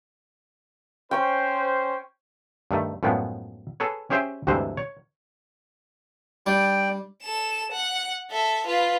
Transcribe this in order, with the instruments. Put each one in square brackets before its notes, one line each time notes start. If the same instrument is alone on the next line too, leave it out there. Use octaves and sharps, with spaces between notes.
[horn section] C#4 C5 [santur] G5 C#6
[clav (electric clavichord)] G2 D#3 A3
F#2 A2 F3 G#3 B3
G#4 A4 B4 C#5
C#4 G4 G#4 C5 E5 G5
D2 G2 C3 E3 G#3 C5
C#5
[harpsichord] G3 D4 [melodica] D5 G5
[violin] A4 E7
F#5
A4 E5
F4 B4